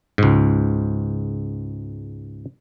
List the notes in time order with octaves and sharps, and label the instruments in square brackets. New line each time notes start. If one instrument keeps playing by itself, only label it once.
[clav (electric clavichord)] C#2 G#2